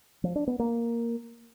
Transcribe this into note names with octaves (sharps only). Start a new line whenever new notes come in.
F3
D4
B3
A#3